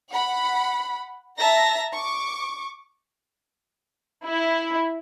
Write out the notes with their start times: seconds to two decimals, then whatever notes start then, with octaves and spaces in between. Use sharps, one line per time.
0.12 F#5 B5
1.39 E5 A5 A#5 A#6
1.93 C#6 D6
4.27 E4